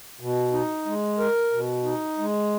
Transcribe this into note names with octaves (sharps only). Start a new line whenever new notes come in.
B2
D#4
G#3
A#4
B2
D#4
G#3